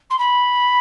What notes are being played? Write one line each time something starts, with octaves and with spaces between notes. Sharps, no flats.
C6
B5